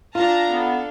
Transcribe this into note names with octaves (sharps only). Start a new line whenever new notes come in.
D4 F4 F5 A5 A#5
B3 A4